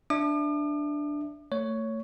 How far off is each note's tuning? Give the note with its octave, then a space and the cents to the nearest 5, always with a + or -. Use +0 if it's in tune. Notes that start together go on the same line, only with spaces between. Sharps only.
D4 +0 E5 +0 D6 +45
A3 +30 C#5 +5